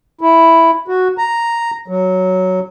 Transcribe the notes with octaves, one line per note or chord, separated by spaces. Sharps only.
E4
F#4
A#5
F#3